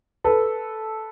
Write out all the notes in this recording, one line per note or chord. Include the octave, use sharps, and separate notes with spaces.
A4 B4